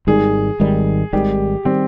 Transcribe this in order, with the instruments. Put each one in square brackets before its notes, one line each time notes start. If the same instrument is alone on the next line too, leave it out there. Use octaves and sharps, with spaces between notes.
[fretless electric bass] G#1 G#2 D#3 G3 [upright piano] G#4
[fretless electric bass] G#1 G#2 D#3 G3
[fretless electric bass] G#1 G#2 D#3 G3 [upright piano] G4
[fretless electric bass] D#3 G3 [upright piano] C4